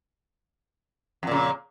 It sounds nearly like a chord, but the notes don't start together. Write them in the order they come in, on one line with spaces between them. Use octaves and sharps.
F2 A#2 C#3